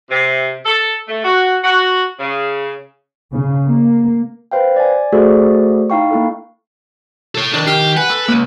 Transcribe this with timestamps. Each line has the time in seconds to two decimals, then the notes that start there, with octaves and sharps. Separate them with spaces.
0.10 C3
0.66 A4
1.09 A3
1.24 F#4
1.63 F#4
2.18 C#3
3.32 C#3
3.66 A#3
4.51 B4 C5 F5 G5
4.76 D5 G#5
5.12 A3 F#4 G#4 A4 C5 D5
5.90 D#4 E4 F5 G5 C#6
6.11 A#3 E4 A4
7.35 A4 C#5
7.54 D#3 D4
7.67 G4 F6 G6 C7
7.97 B4 F#5 G#5
8.10 A4
8.28 C#2 A#3